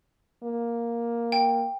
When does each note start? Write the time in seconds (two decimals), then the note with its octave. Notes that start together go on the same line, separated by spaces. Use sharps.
0.43 A#3
1.32 G5